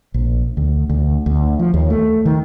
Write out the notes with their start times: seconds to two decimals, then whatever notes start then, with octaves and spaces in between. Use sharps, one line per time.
0.14 A#1
0.57 D2
0.90 D2
1.26 D2
1.59 F3
1.74 D#2
1.90 A3
2.25 D#3